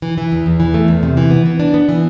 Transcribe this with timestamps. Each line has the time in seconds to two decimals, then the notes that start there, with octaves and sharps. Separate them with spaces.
0.02 E3
0.18 E3
0.32 E2
0.46 E2
0.60 E3
0.74 A3
0.88 E2
1.03 C3
1.17 E3
1.31 B3
1.46 E3
1.60 D4
1.74 B3
1.89 E3